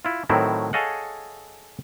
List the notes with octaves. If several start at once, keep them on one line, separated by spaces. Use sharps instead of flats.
E4 F4
A2 D#3 F#3 C4 E4
G#4 A4 C#5 D#5 F5 F#5